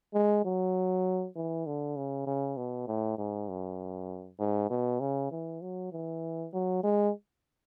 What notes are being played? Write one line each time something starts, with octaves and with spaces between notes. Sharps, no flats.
G#3
F#3
E3
D3
C#3
C#3
B2
A2
G#2
F#2
G#2
B2
C#3
E3
F#3
E3
F#3
G#3